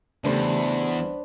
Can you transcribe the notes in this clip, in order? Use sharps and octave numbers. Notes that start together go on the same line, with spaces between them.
E2 C#3 A3 D4 G4 B4 C5